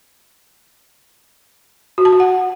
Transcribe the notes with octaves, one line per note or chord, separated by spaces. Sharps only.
F#4
A5
F#4
F#5